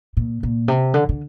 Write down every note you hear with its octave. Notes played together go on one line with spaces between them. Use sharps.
A#2
A#2
C3
D3
D3